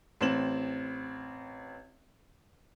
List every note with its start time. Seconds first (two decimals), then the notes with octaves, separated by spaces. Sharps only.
0.21 A1 C4 E7 F#7